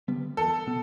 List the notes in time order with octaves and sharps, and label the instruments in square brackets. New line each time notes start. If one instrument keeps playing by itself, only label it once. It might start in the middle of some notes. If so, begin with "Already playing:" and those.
[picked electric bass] D3 G3 B3
[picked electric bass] E2 [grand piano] A4
[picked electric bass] B2 B3